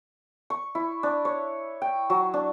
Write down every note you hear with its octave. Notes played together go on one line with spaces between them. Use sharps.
C#6
E4
D4
C#5
G5
F#3
D4